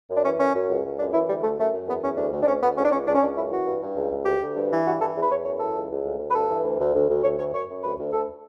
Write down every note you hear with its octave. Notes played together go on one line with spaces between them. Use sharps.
F#2
D4
E3 C#4
F#2 C#4
F#2
C#2
C#2
F#2 D4
E3 E4
D2 G3
D2 A3
F#2 A3
F#2
E2 B3
E2 C#4
D2 D4
D2
D4
D2 C#4
D2 B3
C#2 C#4
D4
C#2 C#4
C#2 D4
C#4
C#2 D4
F#2 E4
E3 F#4
G2
G2
C#2
C#2
D2 G4
D2
G2
E3
G2 F#4
E3 A4
E2
B4
E2 C#5
F#2 C#5
E3 A4
C#2
C#2
D2
D2
B4
G2 A4
E3
D2
D2
D2
D2
D2 C#5
D2 C#5
F#2 C#5
F#2
D2 B4
D2
D2 A4